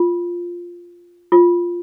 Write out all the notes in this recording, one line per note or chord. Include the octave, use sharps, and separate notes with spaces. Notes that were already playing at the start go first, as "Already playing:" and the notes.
Already playing: F4
F4